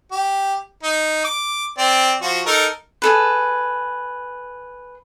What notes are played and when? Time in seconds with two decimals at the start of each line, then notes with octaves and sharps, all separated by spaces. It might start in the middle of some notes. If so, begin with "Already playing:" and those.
0.11 G4
0.83 D#4
1.24 D6
1.78 C4 D5
2.22 F3 F#4
2.46 D#4 A4 A#4
3.02 G#4 A4 B4